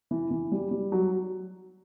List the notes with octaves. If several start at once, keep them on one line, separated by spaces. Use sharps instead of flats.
E3
E3
G3
G3
F#3